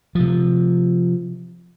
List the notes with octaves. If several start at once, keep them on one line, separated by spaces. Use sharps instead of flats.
C3 F3